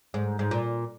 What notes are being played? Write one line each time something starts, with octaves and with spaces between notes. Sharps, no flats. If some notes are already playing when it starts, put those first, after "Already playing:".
G#2
G#2
A#2